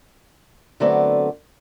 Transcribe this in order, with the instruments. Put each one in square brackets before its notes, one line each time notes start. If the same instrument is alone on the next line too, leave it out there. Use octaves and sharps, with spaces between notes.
[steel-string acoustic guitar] D3 F#3 A3 B3 C4 D5